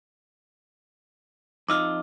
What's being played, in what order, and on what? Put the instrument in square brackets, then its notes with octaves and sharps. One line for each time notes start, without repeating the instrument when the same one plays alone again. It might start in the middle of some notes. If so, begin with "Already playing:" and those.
[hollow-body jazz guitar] F2 D#4 F4 [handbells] D6 E6 F6